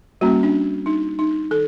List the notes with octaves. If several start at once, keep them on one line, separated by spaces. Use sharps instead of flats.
G3 A#3 C#4 F#4
D4
D#4
D#4
D#3 A4